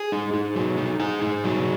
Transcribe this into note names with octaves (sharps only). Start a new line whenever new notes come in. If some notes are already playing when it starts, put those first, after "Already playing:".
Already playing: G#4 G#5
D#4
D#4
F#3
D#4
D#4 G#4 G#5
D#4
F#3